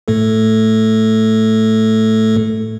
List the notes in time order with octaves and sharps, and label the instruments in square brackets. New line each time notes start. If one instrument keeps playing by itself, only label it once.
[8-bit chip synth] A2 A3 A4